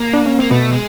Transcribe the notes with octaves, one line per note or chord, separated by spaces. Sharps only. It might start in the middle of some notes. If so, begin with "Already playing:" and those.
Already playing: A#3
D4
C#4
A#3 C4
B2 A3 B3
G#3